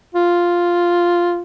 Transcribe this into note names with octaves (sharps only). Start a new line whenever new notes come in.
F4